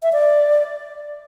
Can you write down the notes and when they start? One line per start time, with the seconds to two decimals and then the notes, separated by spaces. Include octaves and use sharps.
0.03 E5
0.13 D5